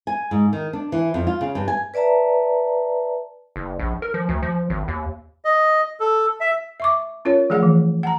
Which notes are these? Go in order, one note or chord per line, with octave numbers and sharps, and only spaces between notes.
G#5
G#2
D#3
D4
E3
F2
F4
C#3
G2
G#5
B4 D5 E5 A5 A#5
F#1
A#1
A#4
F3
D2
F3
G#1
D#2
D#5
A4
E5
E5 C#6 D6
C#4 F4 A#4 C#5
F3 A3 G#4 F5 F#5
E3
F#5 A5 A#5